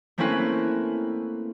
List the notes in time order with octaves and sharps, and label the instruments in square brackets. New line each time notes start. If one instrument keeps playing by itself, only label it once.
[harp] A3 A#3 C4 C#4 E4 B4